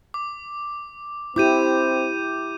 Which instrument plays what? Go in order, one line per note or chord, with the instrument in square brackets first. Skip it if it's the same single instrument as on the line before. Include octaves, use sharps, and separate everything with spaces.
[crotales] D6
[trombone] C4 [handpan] E4 G4 [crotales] D6 G6 D#7